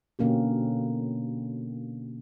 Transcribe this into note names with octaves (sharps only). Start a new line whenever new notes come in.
B2 D3 A#3 C#4 G4